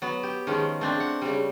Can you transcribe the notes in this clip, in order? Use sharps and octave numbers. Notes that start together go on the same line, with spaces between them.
F#3 B3
G4
D#3 F3 G#3 C#4
A3 C4 D4
F#5
C#3 G3